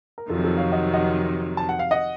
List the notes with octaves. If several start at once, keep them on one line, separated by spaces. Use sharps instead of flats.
A#4
F2 C3 D#3 F#3 F4 A4
F4 A4
C#5 F5
D#5 F#5
D#5 F#5
A5
F#5
F5
D#5 F#5